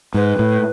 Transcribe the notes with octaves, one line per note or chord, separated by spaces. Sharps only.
G#2 B4
A2